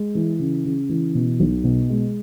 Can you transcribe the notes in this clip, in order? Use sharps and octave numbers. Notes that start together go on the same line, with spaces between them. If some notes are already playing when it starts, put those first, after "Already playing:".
Already playing: G#3
E3
C#3
C#3
E3
B2
B1
B2
G#3